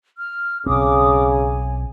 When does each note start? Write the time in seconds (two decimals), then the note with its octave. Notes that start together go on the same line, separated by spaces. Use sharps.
0.17 F6
0.66 B1 C#3 C4 D6 D#6
1.30 G#5